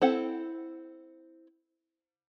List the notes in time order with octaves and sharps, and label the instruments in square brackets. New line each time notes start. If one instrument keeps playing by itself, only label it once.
[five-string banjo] C4 E4 A4 F#5